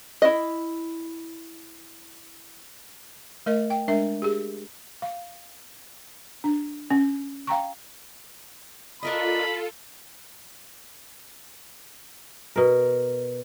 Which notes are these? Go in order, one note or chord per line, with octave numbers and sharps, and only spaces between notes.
E4 D#5
A3 A#4 D#5
G5
G#3 D4 A#4 E5
G4 G#4
F5
D4
C#4
F5 G5 A#5 C#6
D4 F4 A4 A#4 D#5 B5
B2 A#4